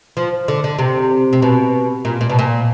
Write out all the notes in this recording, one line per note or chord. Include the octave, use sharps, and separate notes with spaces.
F3
D3
D3
C3
C3
B2
A#2
A#2
B2
A#2